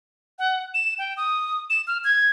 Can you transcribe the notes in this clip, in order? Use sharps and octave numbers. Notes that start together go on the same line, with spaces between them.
F#5
E7
G5
D#6
E7
F6
G#6